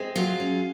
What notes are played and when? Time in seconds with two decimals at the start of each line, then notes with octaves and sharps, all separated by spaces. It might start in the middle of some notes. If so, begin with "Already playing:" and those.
Already playing: G#3 C4
0.16 F#3 F4
0.40 C#4